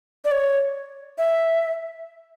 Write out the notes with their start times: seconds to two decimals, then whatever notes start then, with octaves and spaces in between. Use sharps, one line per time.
0.24 D5
0.31 C#5
1.18 E5